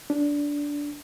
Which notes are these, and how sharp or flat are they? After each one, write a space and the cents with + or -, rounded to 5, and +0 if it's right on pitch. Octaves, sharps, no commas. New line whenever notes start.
D4 -15